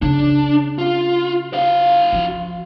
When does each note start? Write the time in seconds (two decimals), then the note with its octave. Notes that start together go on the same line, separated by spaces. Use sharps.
0.02 C#3 D4
0.79 F4
1.53 F#4 F5
2.13 F3